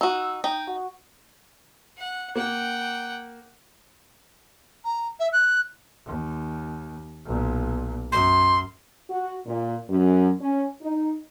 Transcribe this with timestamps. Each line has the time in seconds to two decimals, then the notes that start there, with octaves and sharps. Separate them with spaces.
0.01 D#4 F#4 E6
0.44 D#4 G5
0.68 F#4
1.97 F#5
2.36 A#3 F#5 G5
4.84 A#5
5.19 E5
5.32 F#6
6.06 D#2
7.25 B1 A#2
8.12 F#2 C6
9.10 F#4
9.46 A#2
9.89 F#2
10.40 C#4
10.81 D#4